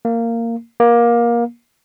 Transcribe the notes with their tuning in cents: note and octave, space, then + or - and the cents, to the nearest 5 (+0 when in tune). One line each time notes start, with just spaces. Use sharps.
A#3 -15
A#3 +20